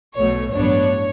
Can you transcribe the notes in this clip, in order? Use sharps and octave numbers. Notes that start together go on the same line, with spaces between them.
B1 B2 F#3 A3 C#5
A1 G2 F#3 B3 D4 C#5